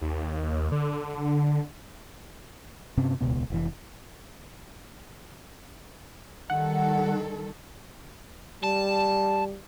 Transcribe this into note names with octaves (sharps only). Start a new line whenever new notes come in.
D#2
D3
G2 C3 C4 C#4
D#1 C#2 B2 B3
F1 A2 E3
D#3 G3 A4 F#5
G3 A5